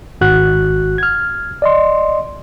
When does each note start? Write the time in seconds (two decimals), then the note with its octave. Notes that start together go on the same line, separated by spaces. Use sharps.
0.21 G#1 F#4 F#6
0.98 F6 G#6
1.62 D5 D#5 C6